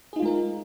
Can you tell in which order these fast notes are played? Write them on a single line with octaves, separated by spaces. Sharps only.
G#4 D#4 F4 G#3 A#4